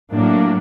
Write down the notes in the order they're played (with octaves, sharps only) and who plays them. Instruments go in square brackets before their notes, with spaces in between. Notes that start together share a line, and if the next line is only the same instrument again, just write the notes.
[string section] A2 F#3 A#3 D4